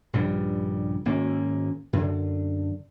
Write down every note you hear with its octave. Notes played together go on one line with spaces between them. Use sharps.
A#1 G2 C#3 G3
G#1 A#3 C#4
F#2 D3